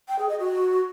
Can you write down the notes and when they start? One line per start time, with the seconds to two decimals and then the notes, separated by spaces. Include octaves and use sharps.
0.08 G5
0.19 G#4
0.29 D#5
0.39 F#4